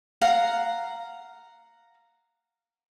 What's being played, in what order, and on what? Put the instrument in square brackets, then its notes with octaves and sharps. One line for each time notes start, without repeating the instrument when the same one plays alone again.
[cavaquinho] F5 F#5 A#5